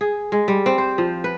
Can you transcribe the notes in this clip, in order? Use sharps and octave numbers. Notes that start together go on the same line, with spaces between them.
G#4
G#3
G3
C4
C5
F3
B4